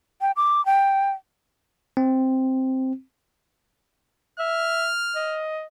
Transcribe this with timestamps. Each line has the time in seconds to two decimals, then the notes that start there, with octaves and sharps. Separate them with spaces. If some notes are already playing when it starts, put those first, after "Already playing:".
0.21 G5
0.36 D6
0.66 G5
1.97 C4
4.39 E5 F6
5.16 D#5